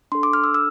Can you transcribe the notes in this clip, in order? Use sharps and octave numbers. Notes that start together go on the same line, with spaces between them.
D4 A4 C6
D6
F6
E6
E6